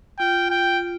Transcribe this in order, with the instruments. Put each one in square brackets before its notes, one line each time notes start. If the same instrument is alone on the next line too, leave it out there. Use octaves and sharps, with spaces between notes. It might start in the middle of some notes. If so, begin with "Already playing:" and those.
[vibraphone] F4 [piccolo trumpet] G5
[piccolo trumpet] G5